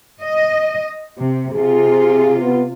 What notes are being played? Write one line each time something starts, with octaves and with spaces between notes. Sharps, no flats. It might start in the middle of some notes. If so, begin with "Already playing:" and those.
D#5
C3
C3 F4 G#4
B3